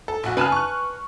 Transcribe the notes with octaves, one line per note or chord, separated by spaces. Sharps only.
A4
A#1 F#4
C#3 B4 G#5 A5 F6
C#6 F#6